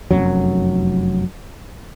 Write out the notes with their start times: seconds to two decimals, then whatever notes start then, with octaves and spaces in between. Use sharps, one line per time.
0.11 F1 C2 F#2 F#3